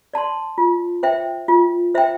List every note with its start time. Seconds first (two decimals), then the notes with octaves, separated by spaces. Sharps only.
0.14 D5 A5 C6
0.58 F4
1.03 C5 E5 G5
1.48 F4
1.95 C5 E5 G5